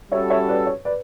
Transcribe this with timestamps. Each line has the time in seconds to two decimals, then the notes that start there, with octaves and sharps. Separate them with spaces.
0.12 G3 C#4 F#4 A4 C#5 E5
0.30 C#5 E5
0.48 B4 D5
0.67 C#5
0.85 B4 D5